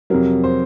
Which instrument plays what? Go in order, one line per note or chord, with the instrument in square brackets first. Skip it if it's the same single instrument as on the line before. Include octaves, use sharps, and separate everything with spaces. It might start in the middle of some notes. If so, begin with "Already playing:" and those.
[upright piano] F2 C3 F#3 A#4
C5